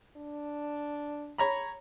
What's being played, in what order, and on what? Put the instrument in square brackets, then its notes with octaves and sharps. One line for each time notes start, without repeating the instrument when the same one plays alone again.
[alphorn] D4
[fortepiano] C#5 A#5 B5